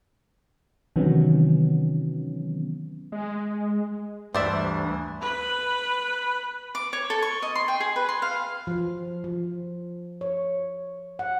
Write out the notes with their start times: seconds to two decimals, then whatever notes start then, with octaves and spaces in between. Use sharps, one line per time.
0.96 C3 D#3 E3 F#3 B3 C#4
3.12 G#3
4.34 D2 G2 E3 C5 D5 E5
5.21 B4 B5
6.75 D6
6.93 C#5
7.10 A4
7.22 C#6
7.42 D#5
7.55 C6
7.68 G5
7.80 G#4
7.96 B4
8.09 C6
8.22 F5
8.67 F3
9.24 F3
10.21 C#5
11.19 F#5